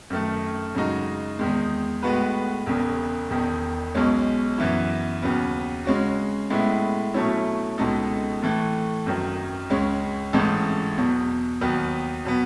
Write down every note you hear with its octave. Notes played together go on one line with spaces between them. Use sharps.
F#2 D#3 A3
F#2 C#3 G#3 D#4 F#4
E2 D#3 G#3
A2 G#3 B3 F#4 B4
E1 E2 C#3
E1 E2 D#3
B1 B2 G#3 C#4
F#2 E3 B3 E4
D#2 C#3 F#3 B3
C#3 G#3 C#4 F#4
A2 G#3 B3 E4
B2 F#3 A3 C#4 E4
C#2 B2 G#3 D#4 A4
A2 E3 A3
G#1 F#2 D#3 F#3
C#2 C#3 G#3 C#4
A1 G#2 E3 A3
E2 B2 F#3
D#2 D#3 F#3 B3
B2 F#3 B3